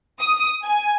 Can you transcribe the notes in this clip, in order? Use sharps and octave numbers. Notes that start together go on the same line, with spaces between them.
D#6
G#5